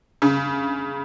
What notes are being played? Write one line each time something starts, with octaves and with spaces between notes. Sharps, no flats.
C#3